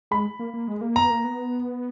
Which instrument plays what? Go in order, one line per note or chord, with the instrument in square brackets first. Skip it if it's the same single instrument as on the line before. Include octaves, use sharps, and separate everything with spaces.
[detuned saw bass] G#3 [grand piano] B5
[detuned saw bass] A#3
A#3
G#3
A#3
[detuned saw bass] B3 [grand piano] A#5
[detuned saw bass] A#3
B3